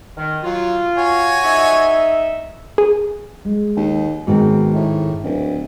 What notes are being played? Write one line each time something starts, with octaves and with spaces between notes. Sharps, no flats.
D#3
F#3 F4
F#4 C#5 G#5
D#4 A4 E5
G#4
G#3
D#2
G#2 B2 D#3 C4
A2
D1